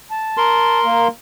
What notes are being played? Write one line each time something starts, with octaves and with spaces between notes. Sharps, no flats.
A5
A#4 C6
A#3